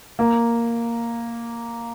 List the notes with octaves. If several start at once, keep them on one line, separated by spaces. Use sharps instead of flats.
A#3